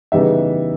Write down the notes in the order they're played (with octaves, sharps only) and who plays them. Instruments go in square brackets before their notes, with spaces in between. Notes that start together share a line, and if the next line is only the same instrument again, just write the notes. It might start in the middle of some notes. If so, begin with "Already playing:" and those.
[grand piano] C#3 E3 G3 B3 D#4 E5